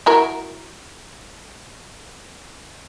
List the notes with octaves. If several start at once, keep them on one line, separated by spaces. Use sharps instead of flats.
E4 F#4 A#4